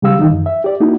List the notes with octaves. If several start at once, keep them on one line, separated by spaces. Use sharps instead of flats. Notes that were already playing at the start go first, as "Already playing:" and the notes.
C#3 F#3 G3 G4 F5 E6
D#3 E3 D#4
F#2
E5
G4 D5
A#3 D#4 E4 F#4